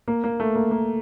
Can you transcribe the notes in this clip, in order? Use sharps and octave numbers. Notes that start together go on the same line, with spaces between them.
A#3
A#3
A3
A#3
A#3